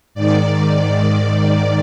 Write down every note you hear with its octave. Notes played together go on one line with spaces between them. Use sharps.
G#2 D#3 D5